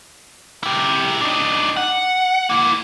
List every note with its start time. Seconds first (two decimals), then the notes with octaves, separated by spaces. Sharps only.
0.63 E4 G4
1.21 D4 D#4
1.77 F#5
2.50 A#3 E4